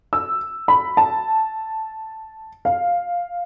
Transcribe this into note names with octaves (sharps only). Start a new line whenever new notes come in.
E6
B5
A5
F5